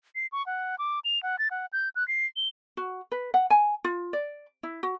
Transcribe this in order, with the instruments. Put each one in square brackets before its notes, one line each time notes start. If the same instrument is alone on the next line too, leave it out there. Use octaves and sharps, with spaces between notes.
[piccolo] C7
C#6
F#5
D6
F7
F#5
A6
F#5
G6
F#6
C7
G7
[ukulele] F#4
B4
F#5
G#5
F4
D5
E4
F#4